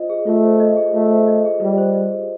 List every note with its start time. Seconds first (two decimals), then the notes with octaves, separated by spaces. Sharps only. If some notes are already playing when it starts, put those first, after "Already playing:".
Already playing: F4 C5 D#5
0.10 G#4
0.26 A3 F4
0.44 C5
0.60 D#5
0.76 G#4
0.93 A3 F4
1.11 C5
1.27 D#5
1.45 G#4
1.61 G3 F4
1.78 C5
1.94 D#5
2.11 G#4